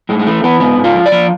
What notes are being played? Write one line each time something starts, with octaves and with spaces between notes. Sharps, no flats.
A2 G#3
G#3
E3 A3
E3 B3
G#2 B3
G#2
F4
F3
D5
F3